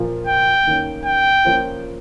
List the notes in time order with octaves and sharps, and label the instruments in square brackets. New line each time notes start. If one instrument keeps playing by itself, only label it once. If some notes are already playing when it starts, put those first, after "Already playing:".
Already playing: [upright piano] A#2 F3 A#3
[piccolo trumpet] G5
[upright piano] D#3 A#3 C#4
[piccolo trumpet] G5
[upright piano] F3 A#3 C#4 F4 C5